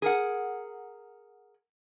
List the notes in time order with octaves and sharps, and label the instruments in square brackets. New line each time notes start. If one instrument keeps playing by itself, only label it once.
[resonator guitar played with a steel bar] G#4 A#4 F#5